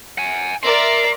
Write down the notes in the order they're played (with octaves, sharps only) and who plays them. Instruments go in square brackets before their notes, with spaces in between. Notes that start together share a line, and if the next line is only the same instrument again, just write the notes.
[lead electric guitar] F#5 G#5
[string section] A#4 D5 E5 [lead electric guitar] C6